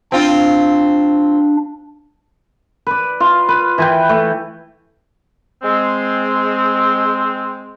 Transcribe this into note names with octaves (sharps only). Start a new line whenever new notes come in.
C4 D4 F4
B4 D5
F4 F5
B4
E3 B4 G5
A3
G#3 C4